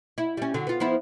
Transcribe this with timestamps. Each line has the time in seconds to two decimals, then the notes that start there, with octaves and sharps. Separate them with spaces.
0.18 E4
0.37 G3 C#4
0.54 D3 F#3
0.67 B3 F4
0.80 F3 B3 E4